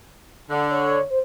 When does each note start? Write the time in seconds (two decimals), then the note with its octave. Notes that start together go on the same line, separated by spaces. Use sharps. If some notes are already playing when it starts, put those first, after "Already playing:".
0.50 D3
0.70 C#5
1.10 C5